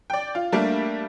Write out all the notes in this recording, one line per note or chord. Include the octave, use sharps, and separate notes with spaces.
D5 G5
F4
G3 A3 A#3 D4